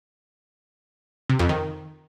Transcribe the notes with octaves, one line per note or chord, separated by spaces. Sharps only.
C3
F2
D#3